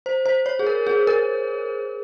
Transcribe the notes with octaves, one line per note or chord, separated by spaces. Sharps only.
C5
C5
C#5
G#4
A#4
G#4
A#4